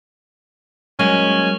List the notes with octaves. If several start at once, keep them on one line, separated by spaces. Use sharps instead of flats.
F#3 G#3 A#3 C#4